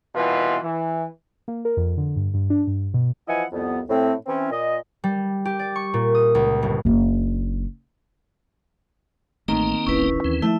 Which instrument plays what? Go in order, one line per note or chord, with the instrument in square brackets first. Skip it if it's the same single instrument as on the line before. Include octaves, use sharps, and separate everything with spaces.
[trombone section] C2 B2 E3 F4 B4
E3
[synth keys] A#3
A#4
F2
D3
G2
G2
D4
G2
B2
[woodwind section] E3 F3 E4 D#5 F#5 G#5
C2 F2 B3
A2 C4
E3 C4 C#4
A#2 D#5
[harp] G3
G4
D5
C#6
A#2
D#6
C#2
G1
[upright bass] F#1 D4
[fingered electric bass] A1 A3 [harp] D#3 [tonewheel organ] A#3 C4 D#4 [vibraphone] A#5
[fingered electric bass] D1 G#1 [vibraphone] C#4 E4 B4
[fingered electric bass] D#2 [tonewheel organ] E3 C4
[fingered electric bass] F3 [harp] A3 [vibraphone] E4 E5